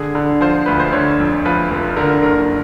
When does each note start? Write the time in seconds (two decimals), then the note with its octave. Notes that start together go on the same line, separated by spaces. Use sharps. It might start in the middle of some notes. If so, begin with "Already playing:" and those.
Already playing: D3 G#4
0.15 D3
0.41 F3 C5
0.66 D2 B4
0.80 C5
0.93 D3 C#5
1.20 F2
1.45 F3 B4
1.71 F1
1.97 D3 A#4
2.23 F#1 A#4